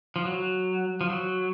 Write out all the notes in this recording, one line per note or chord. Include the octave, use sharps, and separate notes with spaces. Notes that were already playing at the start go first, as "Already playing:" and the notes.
F3
F#3
F3
F#3